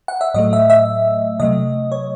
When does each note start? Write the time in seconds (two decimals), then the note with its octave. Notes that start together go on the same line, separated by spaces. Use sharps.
0.08 F#5
0.21 E5
0.34 A2 F#3 A3 D#5
0.53 E5
0.70 E5
1.40 C3 F#3 A3 D#5
1.92 C#5